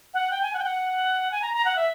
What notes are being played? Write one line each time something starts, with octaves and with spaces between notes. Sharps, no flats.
F#5
G5
G#5
F#5
G5
F#5
G#5
A#5
A#5
F#5
E5